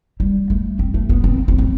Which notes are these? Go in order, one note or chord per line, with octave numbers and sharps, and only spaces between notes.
G3
A3
C4
A3
B3
C4
C4
C4